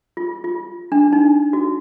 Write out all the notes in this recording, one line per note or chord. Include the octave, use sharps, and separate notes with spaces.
F4
F4
D4
D#4
F#4